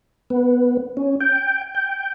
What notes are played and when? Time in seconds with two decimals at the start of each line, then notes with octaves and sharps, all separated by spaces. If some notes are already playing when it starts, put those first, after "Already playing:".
0.30 B3
0.97 C#4
1.21 G5
1.75 G5